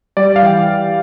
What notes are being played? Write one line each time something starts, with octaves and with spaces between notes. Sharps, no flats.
G3 D5
F5
E3 G5